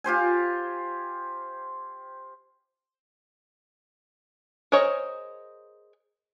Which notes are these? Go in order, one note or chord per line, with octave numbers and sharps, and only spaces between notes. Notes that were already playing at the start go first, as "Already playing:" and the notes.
F4 G4 C5 G#5
G#4 A#4 C5 C#5 D#5